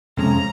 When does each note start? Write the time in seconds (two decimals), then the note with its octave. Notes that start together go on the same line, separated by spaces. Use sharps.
0.17 F2 C3 F3 G#3 C#4 A#5